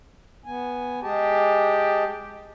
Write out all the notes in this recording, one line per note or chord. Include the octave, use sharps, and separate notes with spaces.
B3 G#5
G#3 G4 G#4 A5